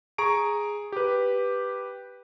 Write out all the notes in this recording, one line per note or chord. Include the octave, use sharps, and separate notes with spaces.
G#4 A#5 C#6 D7
G4 B4